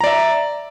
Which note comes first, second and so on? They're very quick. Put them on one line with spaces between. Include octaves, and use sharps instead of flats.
A#5 D5 E5